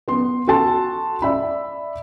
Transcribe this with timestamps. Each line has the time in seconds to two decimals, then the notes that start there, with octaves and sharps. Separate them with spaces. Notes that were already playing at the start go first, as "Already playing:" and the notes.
0.08 B3 C6
0.47 F#4 A4 A5 C6
1.22 D5 E5 B5